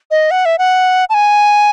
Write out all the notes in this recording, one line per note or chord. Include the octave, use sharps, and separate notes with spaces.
D#5
F#5
E5
F#5
A5
G#5